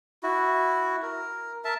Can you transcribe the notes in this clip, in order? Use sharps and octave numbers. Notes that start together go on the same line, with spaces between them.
E4 F#4
A#4
A#4 E5 A5